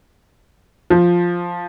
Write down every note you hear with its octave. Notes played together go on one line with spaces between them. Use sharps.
F3